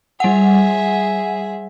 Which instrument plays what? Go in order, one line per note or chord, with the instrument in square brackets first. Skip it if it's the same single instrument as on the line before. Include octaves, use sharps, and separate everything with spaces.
[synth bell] G3 F#5 [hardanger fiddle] G#4 E5